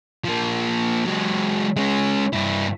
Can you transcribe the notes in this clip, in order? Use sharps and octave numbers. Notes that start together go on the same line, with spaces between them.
F3 A#3
F#3 G#3
G#3 C#4
G2 E4